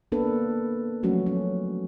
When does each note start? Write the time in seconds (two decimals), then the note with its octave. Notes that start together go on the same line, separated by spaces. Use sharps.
0.12 A#3 B3 D4 A4 B4
1.03 F3 F#3 A3 C#4 F#4
1.26 C#4